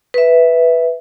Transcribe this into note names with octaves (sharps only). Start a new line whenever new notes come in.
B4 E5